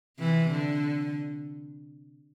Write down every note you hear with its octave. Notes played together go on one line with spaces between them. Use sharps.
C3 E3
D3